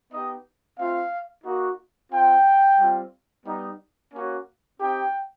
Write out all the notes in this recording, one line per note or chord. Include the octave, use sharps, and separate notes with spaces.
B3 D#4 G4 D#5
A3 C4 F4 F5
A#3 D#4 F#4
C4 F4 G5
G3 C4 F4
G3 B3 D#4
A#3 C#4 F#4
C4 D#4 G4 G5